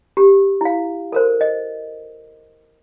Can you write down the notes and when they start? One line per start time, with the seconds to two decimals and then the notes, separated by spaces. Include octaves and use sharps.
0.17 G4
0.61 E4 F5
1.12 A4 A#4 C5
1.41 D#5